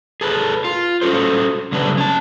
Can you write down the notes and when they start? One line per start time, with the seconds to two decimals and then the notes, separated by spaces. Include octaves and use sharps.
0.21 G#4 A4 B4
0.64 F4
1.02 C#4 F#4 A4 C5
1.72 C#3 F#3 G3 A3 D4 B4
1.97 C#4 A5